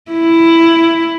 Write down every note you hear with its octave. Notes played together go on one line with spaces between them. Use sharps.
E4